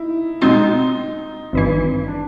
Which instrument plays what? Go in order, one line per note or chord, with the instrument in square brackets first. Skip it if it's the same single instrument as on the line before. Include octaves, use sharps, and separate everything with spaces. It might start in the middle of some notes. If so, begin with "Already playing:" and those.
Already playing: [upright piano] D#4 E4
[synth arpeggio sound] B2 G#3 C4 F4 [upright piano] D#4
[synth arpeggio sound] G#1 G2 E3
[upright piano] D4